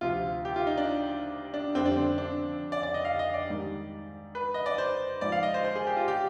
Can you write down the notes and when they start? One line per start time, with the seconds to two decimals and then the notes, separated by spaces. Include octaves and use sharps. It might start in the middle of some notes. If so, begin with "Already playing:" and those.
0.01 D2 C3 F3 F4
0.45 G4
0.56 F4
0.67 D#4
0.77 D4
1.54 D4
1.75 F2 D3 G3 C4
1.86 D4
1.96 C4
2.18 D4
2.72 D5
2.83 D5
2.94 D#5
3.05 F5
3.19 D#5
3.34 D5
3.48 G#2 D#3 G3
4.35 B4
4.54 D#5
4.66 D5
4.78 C5
5.21 G#2 F3 D5
5.32 F5
5.43 D#5
5.54 C5
5.64 C5
5.76 G#4
5.87 G4
5.97 F4
6.08 G4